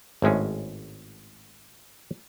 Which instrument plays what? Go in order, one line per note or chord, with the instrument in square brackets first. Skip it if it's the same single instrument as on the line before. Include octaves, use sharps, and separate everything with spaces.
[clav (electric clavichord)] G#1 A2 G#3 C#4